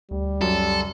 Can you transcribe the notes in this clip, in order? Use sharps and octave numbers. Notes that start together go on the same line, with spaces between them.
D2 G3
C#2 F#2 A4